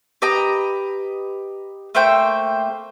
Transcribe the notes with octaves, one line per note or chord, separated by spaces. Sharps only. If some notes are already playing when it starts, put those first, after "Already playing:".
G4 B4 D#5 A#5
A3 A#3 C5 G5